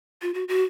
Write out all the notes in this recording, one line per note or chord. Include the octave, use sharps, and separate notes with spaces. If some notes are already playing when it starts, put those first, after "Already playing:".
F4
F#4
F#4